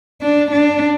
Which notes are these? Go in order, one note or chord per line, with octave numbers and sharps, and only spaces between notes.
D4
D4